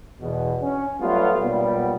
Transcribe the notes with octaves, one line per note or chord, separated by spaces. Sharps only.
E2 B2
C#4
F#3 G3 A3 B3 F4
B1 A#2 G3 B3